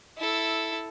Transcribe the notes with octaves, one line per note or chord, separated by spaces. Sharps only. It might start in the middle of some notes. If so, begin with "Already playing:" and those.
E4 A4